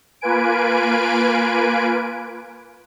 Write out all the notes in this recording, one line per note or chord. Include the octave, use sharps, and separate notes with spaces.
A#3 F4 B4 G#5 D7